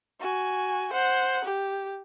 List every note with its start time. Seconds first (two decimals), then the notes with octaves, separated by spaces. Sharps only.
0.20 F#4 G#5
0.93 C5 F#5
1.44 G4